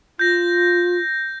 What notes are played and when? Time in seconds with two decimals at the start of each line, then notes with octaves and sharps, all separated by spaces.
0.19 F4 G6 A#6